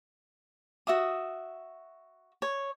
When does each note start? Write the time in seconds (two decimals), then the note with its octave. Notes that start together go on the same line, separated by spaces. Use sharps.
0.87 F#4 E5 D#6
2.42 C#5